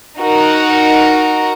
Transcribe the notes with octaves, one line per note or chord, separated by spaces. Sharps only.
D#4 F#4 A#4